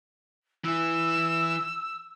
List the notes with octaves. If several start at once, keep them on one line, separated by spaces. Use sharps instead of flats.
E3 E4 E6